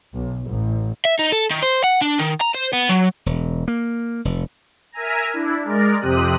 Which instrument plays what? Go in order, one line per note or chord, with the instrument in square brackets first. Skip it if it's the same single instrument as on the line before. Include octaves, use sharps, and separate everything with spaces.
[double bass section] B1
A1
[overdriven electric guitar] E5
D#4
A4
D#3
C5
F#5
D4
D#3
A#5
C5
B3
F#3
[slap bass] E1
A#3
F1
[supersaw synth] A#4 E5 G#5 A#5
D4 E4
G#3 A#4 D5
F2 C3 C4 G4 D#6 F#6